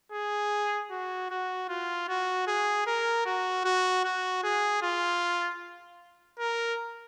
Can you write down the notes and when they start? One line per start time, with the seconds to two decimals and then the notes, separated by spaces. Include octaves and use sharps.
0.12 G#4
0.91 F#4
1.30 F#4
1.69 F4
2.08 F#4
2.47 G#4
2.86 A#4
3.25 F#4
3.65 F#4
4.04 F#4
4.43 G#4
4.82 F4
6.39 A#4